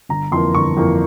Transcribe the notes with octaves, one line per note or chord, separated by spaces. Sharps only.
G1 A#5
F2 E3 A#3 C6
G1 C#6
F2 E3 A#3